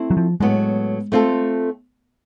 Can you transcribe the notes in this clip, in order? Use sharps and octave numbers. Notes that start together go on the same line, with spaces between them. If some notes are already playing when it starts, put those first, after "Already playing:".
Already playing: A3 C4 E4
F#3
F3
A2 F#3 G#3 B3
A3 C4 F4 A4